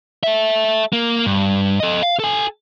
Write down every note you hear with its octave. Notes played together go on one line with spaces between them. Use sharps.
A4 E5
A#3
G2
A4 D#5
F5
A4 G#5